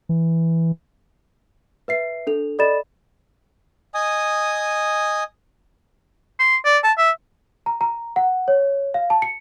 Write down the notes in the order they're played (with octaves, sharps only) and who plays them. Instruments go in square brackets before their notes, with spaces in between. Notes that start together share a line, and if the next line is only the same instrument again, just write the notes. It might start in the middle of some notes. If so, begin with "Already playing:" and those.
[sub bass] E3
[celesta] B4 E5 C7
D4 A4 F7
A4 D5 D#5 B5 A6 E7
[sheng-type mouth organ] D#5 G#5 D#6
[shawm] C6
D5
A5
E5
[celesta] A#5
A#5
F#5
C#5
F5
A5
C#7